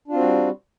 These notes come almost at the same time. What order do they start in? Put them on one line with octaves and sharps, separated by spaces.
D4 F4 C4 F#4 G3